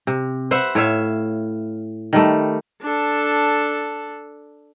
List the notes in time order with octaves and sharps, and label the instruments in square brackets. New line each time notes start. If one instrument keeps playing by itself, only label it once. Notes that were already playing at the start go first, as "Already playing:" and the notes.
[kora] C3
B4 C5 E5 F#5
A2 C#5 E5 F5
D#3 G3 A3
[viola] D4 A4